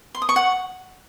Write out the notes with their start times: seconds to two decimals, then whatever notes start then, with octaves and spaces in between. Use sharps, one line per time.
0.15 C6
0.22 D#6
0.29 C#6
0.36 F#5